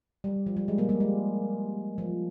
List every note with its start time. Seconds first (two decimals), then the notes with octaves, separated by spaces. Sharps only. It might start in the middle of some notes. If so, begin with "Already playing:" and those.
0.24 G3
0.46 F3
0.57 G3
0.68 G#3
0.78 G3 A#3
0.89 G3 A#3
1.00 G#3
1.98 F3